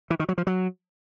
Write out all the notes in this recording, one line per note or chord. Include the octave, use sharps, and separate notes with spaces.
E3
D#3
F#3
F3
F#3